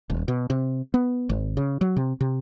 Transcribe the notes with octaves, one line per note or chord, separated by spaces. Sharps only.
D#1
B2
C3
B3
G#1
C#3
F#3
C3
C3